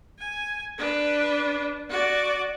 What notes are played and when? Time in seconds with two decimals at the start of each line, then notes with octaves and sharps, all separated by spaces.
0.19 G#5
0.78 D4 B4
1.89 F#4 D5